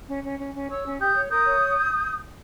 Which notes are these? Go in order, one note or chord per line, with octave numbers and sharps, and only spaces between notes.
C#4
C#4
C#4
C#4
C#5 C#6 E6
C#4
G4 D#6 G6
C#5
A#4 D#6 G6
C#5